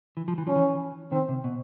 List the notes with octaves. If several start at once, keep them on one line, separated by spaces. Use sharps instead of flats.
E3
F3
E3
F3 C#4
E3
D#3 C4
C3
B2